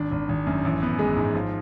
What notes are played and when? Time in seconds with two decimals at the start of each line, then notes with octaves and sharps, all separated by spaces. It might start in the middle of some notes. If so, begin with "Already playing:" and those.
Already playing: G#1 D4
0.11 G#1
0.29 G#1
0.47 F#2
0.65 A1
0.82 B3
0.99 G#3
1.16 G#2
1.35 F3